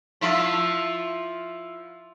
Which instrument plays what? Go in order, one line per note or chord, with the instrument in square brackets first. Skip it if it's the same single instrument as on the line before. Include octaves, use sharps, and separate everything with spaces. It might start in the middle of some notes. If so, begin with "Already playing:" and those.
[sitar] F3 E4 F4